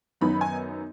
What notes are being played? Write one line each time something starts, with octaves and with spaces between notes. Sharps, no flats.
F#2 D#3 B3 D#4 B5
G#5